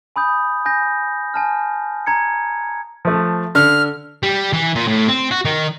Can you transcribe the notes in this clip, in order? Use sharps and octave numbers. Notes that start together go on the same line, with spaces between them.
G#5 B5 D#6 G6
G#5 G6 A#6
G#5 A5 F6
A#5 G#6 C#7
F3 A3
D3 F6
G3
E3
A#2
A2
C4
F#4
D#3